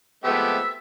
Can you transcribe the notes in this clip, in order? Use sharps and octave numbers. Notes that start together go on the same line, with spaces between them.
F3 G#3 A3 B3 C4 G4 E5